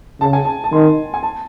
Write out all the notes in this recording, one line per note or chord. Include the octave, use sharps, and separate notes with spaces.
C#3 A5
G#5
A5
A5
D#3 C6
G#5
A5